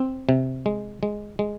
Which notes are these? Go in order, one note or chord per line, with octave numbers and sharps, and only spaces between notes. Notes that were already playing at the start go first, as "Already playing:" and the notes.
Already playing: C4
C3
G#3
G#3
G#3